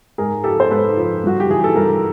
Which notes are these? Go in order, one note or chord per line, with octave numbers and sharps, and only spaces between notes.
G#2 G#4 A#4
F3 G4 A4
C5
G#2 A4 B4
F3
G2 F#4
G4
E3 G#4
A4
G2 G#4 A#4